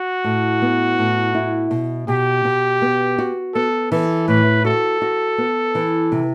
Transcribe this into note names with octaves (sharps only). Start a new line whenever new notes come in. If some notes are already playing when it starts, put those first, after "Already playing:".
Already playing: F#4
A2
B3
A2
E4
B2
B2 G4
B2
B3
F#4
B3 A4
E3 A4
A2 B4
F#4 A4
F#4
B3
E3
C3